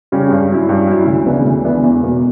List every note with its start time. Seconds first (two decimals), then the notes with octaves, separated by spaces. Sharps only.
0.12 C#3 G3 C#4
0.30 G2
0.50 F#3 C#4 E4
0.69 G2
0.87 F#3 C#4 E4
1.07 D2
1.26 C#3 E3 B3 D4
1.45 D2
1.64 C#3 E3 B3 D4
1.83 E2
2.03 B2 A#3